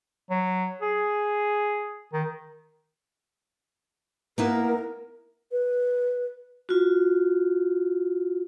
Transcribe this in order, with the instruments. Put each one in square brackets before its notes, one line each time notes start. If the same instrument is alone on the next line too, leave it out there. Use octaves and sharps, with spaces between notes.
[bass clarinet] F#3
G#4
D#3
[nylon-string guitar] A#3 B3 E4 [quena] A#4
[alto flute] B4
[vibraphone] F4 F#4